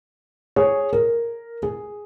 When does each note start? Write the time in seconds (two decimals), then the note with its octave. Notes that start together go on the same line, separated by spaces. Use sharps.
0.56 G#4 C#5
0.93 A#4
1.63 G#4